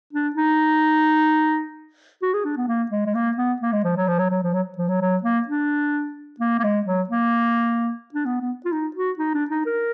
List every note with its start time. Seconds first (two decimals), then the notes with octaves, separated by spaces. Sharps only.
0.13 D4
0.36 D#4
2.22 F#4
2.34 G#4
2.45 D4
2.57 B3
2.68 A#3
2.91 G#3
3.06 G#3
3.15 A#3
3.37 B3
3.62 A#3
3.73 G#3
3.84 F3
3.97 F#3
4.08 F3
4.19 F#3
4.30 F#3
4.43 F3
4.54 F#3
4.78 F3
4.88 F#3
5.01 F#3
5.23 A#3
5.48 D4
6.40 A#3
6.59 A#3
6.64 G#3
6.86 F#3
7.09 A#3
8.14 D4
8.26 B3
8.41 B3
8.65 F4
8.72 D#4
8.96 F#4
9.19 D#4
9.34 D4
9.51 D#4
9.66 A#4